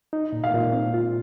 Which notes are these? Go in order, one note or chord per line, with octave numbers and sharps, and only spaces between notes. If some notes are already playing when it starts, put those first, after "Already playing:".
D#4
A#2
F5
A#2
C4
F4